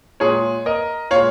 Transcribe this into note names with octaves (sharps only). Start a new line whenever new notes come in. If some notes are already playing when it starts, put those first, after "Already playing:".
A#2 G#3 G#4 C#5
A#4 D#5
A#2 G#3 C#5 F5